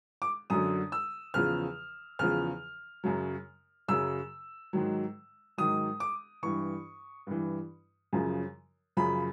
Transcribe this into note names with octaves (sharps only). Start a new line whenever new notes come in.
D6
F#2 D3 F#3 D#6
E6
E2 C#3 F3 F6
E2 C#3 F3 F6
F#2 C#3 F#3
F#2 C#3 F#3 E6
G#2 D#3 F#3
G#2 D#3 F#3 D#6
D6
G2 E3 C#6
G2 E3
F#2 C#3 F3
F#2 C#3 F3 B5